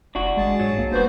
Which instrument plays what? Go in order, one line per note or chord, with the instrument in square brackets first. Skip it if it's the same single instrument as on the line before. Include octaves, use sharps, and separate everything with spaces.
[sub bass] F1 [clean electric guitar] D4 F#4
[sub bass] G#1 [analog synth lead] G#3 [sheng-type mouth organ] G#4 A5
[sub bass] G#2 [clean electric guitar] F#3
[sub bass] B1 [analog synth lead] A#3
[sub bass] E1 [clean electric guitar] G2 F#4 [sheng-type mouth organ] B3 C5